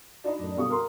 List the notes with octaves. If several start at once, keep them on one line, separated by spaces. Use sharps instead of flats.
D4 D#4 F#4 B5
F#2 A2
B2 D3 G3 F#4 F5 C#6 D#6
A#4 C6